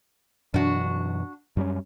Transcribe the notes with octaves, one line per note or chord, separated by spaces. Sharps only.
F#2 B2 E3 D4 F#4
F#2 G3 C#4